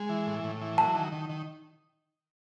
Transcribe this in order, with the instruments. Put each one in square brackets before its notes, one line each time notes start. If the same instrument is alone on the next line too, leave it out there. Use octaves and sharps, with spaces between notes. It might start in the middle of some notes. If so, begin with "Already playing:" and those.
Already playing: [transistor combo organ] G#3
E3
A2
A2
E3
[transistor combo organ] F#3 [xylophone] A5
[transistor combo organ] D#3
D#3
D#3